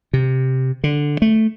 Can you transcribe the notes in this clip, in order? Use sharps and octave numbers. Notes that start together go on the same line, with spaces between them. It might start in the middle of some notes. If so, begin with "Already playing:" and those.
C3
D3
A3